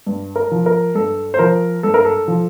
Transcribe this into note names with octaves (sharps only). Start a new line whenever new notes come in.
G2
A#4
F3
A#4
G2 A4
C5
F3 A#4
G2 A4
A#4
A4
F3